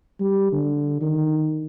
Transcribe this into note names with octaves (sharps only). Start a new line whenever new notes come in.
G3
D3
D#3